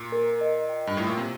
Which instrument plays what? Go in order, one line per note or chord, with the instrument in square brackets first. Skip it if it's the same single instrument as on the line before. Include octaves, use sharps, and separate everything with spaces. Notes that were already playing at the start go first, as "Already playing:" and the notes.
Already playing: [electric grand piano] A#2
[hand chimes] A#4
D#5
G5
[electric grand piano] G2
[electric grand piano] A2 [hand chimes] F4
[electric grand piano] A#2
C3